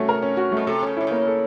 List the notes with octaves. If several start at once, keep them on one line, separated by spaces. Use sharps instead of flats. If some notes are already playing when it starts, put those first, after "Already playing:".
Already playing: C3 A3 C#4 F#4
A#4
C#4
F#4
B2 A3
C3 A4
C#3 C#4
C3 E4
C#3 A#3
A4